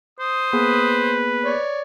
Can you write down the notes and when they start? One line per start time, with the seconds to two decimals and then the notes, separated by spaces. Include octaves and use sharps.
0.19 C5 D#6
0.53 A#3 B3 G#4 B4
1.45 C#5 D5